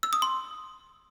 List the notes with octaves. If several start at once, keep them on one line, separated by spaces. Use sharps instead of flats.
E6
D#6
C6